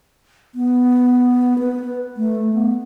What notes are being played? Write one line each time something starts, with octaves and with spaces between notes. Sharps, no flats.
B3
B4
A3
B3